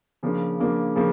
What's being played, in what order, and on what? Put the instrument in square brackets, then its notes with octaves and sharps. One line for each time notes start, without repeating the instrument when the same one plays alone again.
[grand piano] C#3 F3 A#3 D4
C#3 F3 A#3 D4
C#3 F3 A#3